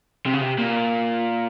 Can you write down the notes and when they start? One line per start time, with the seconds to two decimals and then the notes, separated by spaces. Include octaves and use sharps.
0.26 C3
0.33 C#3
0.41 C3
0.58 A#2